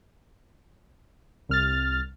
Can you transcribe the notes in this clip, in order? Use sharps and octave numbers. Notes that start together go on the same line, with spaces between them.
C2 F6 A6